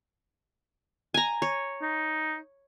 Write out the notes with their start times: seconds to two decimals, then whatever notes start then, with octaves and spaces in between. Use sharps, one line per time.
1.14 G#5 A#5
1.42 C#5
1.82 D#4